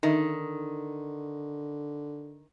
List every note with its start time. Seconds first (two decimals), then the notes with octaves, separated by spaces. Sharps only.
0.03 D3 D#3 D#4 D#5 E5